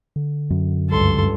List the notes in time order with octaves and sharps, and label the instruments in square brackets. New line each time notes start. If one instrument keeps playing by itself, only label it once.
[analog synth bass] D3
[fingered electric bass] F#2
[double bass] C#2 G2 [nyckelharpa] A4 C6